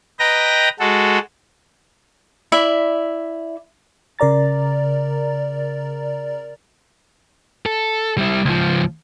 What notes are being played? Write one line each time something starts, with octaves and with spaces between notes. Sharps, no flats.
B4 D#5 G5 A#5 A#6
G#3 F#4 A4
E4 D5 E5
C#3 A#4 D5 A#5 A6
A4
G3 E4
C#2 F3